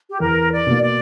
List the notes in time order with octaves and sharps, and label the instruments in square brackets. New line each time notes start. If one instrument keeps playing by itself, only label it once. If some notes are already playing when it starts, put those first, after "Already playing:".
[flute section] G4
[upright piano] E2 [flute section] A#4
[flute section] D5
[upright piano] B2 A#3
[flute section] D5